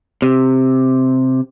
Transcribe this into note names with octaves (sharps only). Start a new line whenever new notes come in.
C3